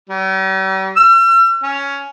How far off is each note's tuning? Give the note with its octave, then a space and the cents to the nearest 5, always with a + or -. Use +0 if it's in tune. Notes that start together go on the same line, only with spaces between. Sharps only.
G3 -45
E6 +45
C#4 +10